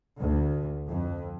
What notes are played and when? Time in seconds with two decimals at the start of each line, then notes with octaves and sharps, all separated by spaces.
0.20 D2
0.89 F2